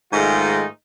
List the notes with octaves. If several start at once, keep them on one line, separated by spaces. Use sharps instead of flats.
G#2 D#3 G#3 A3 D#4 F4